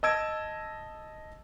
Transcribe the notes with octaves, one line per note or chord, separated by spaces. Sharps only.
D#5 A5 E6 G#6 D7